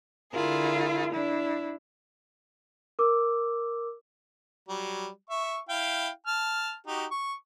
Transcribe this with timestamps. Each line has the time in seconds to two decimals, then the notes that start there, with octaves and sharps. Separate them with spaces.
0.32 D3 E4 F4 G#4 A#4
1.12 D4 E4
2.99 A#4 D6 E6
4.68 F#3 G3
5.30 E5 C#6
5.69 E4 F5 G5
6.27 A5 F6
6.87 D#4 F#4 G4
7.11 C#6